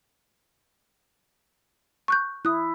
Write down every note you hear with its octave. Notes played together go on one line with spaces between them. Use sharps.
C#6 F#6 G6
E4 D#6 F#6